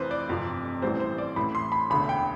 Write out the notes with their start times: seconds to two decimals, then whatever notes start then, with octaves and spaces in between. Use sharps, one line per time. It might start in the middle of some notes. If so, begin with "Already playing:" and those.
Already playing: F1 F2 E3 B4 C5
0.11 D5
0.29 G1 F2 C3 F3
0.82 A1 A2 E3 G3 C4 C5
1.00 C5
1.18 D5
1.36 A1 A2 E3 B5
1.55 C6
1.72 B5
1.90 E1 D2 D3 B5
2.09 G5